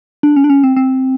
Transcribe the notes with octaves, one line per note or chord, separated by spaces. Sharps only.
D4
C#4
D4
C#4
C4
C4